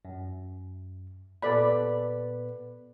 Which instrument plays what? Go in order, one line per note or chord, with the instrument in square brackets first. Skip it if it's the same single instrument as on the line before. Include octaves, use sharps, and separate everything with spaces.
[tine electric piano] F#2
[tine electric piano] A#2 B3 B4 [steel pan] A4 D5 B5